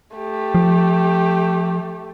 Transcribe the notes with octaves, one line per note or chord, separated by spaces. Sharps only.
A3 G4
F3